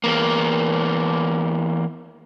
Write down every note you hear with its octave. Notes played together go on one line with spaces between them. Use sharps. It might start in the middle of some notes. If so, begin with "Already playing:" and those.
E2 A#3